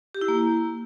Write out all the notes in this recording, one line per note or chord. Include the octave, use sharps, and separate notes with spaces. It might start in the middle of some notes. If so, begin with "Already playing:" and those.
G4
E4
A#3